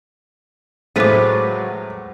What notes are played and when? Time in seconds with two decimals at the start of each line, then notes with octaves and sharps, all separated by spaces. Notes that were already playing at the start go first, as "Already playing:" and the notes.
0.96 A2 F#3 G#3 F4 B4 C5 D6